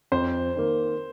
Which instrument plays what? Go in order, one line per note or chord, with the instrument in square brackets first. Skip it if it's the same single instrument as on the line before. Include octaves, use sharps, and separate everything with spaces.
[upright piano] F2 [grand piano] C5
[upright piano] D#3 A#3